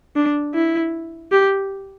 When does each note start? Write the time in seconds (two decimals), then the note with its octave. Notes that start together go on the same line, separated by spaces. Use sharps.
0.16 D4
0.55 E4
1.32 G4